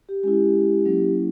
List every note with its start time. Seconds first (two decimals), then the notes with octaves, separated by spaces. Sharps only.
0.09 G4
0.23 G#3 C#4 E4 G4
0.86 F#3 A#3 C#4 E4